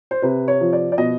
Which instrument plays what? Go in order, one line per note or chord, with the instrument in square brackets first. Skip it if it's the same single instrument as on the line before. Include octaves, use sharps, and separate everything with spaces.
[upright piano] C5
C3 B4
C#5
F3
D5
D5
B2 D#5